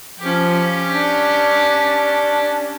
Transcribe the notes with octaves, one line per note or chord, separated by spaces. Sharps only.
F3 C#4 G4
D4